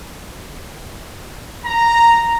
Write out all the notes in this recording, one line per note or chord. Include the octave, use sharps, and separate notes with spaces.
A#5